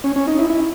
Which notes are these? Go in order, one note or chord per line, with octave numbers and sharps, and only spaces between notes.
C#4
C#4
D#4
E4
E4